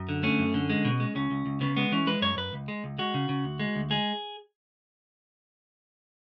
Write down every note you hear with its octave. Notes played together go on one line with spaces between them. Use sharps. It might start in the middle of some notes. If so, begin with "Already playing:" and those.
Already playing: F#2
D3
A3 C#4
F#2
D3
G#3
B2
G#3
C#2 C#4
C#2
C#2
C#3 B3
G#3 B3
E3 C#4
G#3 B4
F#2 C#5
F#2 B4
C#2
G#3
C#2
G#3 F#4
C#3
C#3
D2
G#3
D2
G#3 G#4